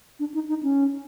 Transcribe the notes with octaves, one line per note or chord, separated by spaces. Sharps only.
D4
D#4
D#4
C#4